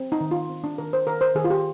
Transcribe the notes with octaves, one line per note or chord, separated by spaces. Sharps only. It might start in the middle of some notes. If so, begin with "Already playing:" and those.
Already playing: C4
D#4
D#3
F4
C4
D4
D#3 A#4
C5
D#3 A#4
C5
D#3 G#4
F4
G4